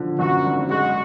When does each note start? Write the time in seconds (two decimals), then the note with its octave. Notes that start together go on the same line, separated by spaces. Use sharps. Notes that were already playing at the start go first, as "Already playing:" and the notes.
Already playing: D3 F3
0.19 F#2 F#4
0.44 G#1
0.70 G#3 F#4